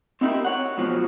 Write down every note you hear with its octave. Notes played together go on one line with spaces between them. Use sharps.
C4 D#4 E4 F#4 G4 A#4
C#5 F#5
G#2 B2 F3 F#3